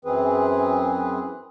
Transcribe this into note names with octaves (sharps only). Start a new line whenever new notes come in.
F#2 E3 C4 G#4 B4